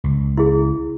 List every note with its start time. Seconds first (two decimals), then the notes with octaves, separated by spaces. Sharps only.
0.04 C#2
0.38 E4 G#4